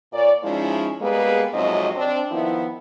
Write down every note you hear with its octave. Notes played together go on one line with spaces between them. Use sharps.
A#2 A#4 C#5 D5
F3 G#3 C#4 D#4 E4
G3 G#3 A#3 B3 G#4 B4
F2 G#2 C3 F#3 C#5 D#5
C4 D4
D#3 F3 B3 E4